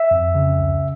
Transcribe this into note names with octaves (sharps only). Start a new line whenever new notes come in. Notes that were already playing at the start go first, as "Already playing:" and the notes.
Already playing: E5
F2
C#3
C#2